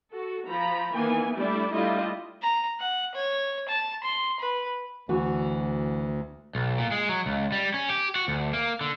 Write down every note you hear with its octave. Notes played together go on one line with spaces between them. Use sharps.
F#4 A4
F3 A#5 B5
D#3 E3 A#3 B3 G#5
G3 A3 D4 E4 D5
G3 A3 D4 E4 F4 D#5
A#5
F#5
C#5
A5
C6
B4
D2 E3 F#4
B1
A#2
G#3
F#3
C#2
G3
C#4
G4
F#4
D2
A#3
D3